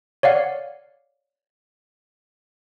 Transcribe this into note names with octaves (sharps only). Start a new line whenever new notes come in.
C#5 D5 F5 F#5